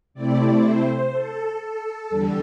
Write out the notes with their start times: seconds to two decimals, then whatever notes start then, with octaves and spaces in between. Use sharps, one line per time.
0.14 C3 A3 C4 E4 D5
0.63 C5
1.12 A4
1.61 A4
2.10 E2 D3 G3